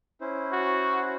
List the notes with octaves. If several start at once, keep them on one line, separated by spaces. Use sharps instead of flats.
C#4 E4 C5
F#4